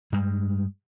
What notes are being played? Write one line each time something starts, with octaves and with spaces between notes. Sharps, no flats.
G2 G3 G#3